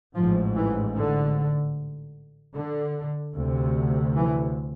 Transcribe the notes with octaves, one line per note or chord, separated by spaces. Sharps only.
A1 G#2 F3
E3
D3
D3
D2 C3
E3